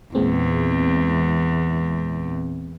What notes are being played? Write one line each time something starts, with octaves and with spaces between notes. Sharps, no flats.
E2 A#2 G#3 C4